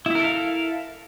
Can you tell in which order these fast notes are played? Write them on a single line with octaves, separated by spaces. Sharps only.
E4 E5 A#4 A4 F5